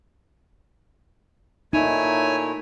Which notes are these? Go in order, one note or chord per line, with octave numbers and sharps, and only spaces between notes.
A#2 A3 D#4 E4 C#5 G#5